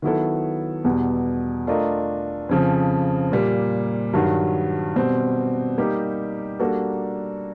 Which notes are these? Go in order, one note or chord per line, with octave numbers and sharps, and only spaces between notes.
D#3 F#3 B3 E4 A4
E2 B2 G3
A3 D4 F4 A#4 D#5
F2 C#3 F3
A#2 G3 A#3
G2 D#3 F#3
B2 G3 C4
G3 A#3 D#4 G4
G3 A#3 D4 F#4 A4